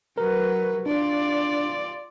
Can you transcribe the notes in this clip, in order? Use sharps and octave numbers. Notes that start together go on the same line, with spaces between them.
F#3 A#4 B4
D4 F4 D5